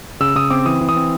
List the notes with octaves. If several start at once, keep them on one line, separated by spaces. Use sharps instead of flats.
C#3 E6
C#3 D#6
C4 D6
E3 D#6
E3
D#6
C4